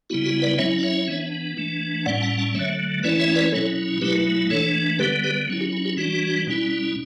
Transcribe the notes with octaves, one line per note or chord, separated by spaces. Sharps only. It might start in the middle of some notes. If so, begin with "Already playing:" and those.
C#3 G3 B3 E4 F#4
F#4
B4 D5
F#3 C#4 E4 C#5 E5
D5
C#5 E5
E3 B3 D4
E3 A3 D4
A2 G3 C#4 D5 F#5
F#5 A5
F#5 A5
D3 F#3 A3 C#5 E5
E3 A3 C#4 E4 B4 D5
C#5 E5
B4 D5
B2 F#3 C#4 E4 A4 C#5
B2 F#3 A3 E4 G4 B4
E3 A3 D4 A4 C#5
D3 G3 B3 G4 B4
G4 B4
F#3 C#4 E4
E4 G4
E4
E4 G4
E3 G3 D4 F#4
B2 G3 C#4 E4